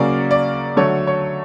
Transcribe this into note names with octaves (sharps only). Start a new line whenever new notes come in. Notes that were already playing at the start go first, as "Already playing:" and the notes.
Already playing: C#3 F#3 A#3 C#4 D5
D5
D3 F#3 A3 C#5
C#5